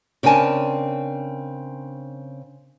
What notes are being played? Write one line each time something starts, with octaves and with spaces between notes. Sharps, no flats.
C#3 C4 D4 A#4 G#5 A5